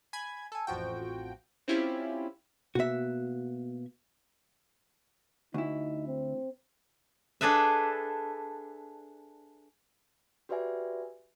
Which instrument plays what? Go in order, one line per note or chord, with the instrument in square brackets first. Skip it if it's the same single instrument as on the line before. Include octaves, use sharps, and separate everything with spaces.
[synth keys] G#5 B5 G#6
A4 G#5
A1 F2 F3 F#4 G5
C4 C#4 E4 F4 G4
[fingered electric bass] B2 A#3 B3 [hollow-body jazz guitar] F#4 E5
[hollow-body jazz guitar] D2 E4 [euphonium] D#4
[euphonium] C4
[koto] D4 G#4 A4 B4 E5
[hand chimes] F#4 G4 B4 D5 E5 G#5